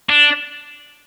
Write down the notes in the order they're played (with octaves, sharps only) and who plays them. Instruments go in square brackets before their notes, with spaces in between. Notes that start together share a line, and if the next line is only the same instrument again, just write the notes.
[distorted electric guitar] D4